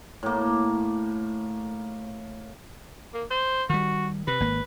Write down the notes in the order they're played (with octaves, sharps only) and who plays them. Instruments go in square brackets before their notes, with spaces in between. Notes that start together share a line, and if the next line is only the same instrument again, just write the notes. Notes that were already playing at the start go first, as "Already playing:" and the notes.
[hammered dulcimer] A2 A#3
[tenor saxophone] A#3
C5
[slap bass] D#3 G3 [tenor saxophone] F#4
[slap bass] C3 [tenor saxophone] B4
[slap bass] G#1 A#3